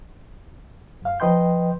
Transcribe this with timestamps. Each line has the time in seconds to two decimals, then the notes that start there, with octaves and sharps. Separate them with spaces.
1.02 F#2 F5
1.20 F3 B4 D#5 G5 C6 G6